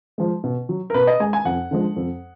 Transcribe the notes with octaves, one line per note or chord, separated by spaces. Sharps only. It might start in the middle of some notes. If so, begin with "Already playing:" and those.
F3 G#3
B2
F#3
A#4
B2 B4
D#5
G#3 G#5
G#5
F2 F#5
D3 F3 G#3
F2